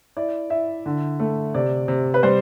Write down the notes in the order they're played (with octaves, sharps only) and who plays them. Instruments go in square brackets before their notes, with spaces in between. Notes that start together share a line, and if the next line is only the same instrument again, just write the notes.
[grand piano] E4 D5
E4 E5
D3
A3
C3 D5
C3
B4
G3 C5